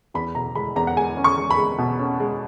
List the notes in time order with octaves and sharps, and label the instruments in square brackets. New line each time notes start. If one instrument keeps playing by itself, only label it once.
[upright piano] E2 B5
B2 A#5
G#3 B5
E2 A#5
F#5
G#3 G#5
C#4
C#6
G#3
B5
G#3
B2
C#4
G#3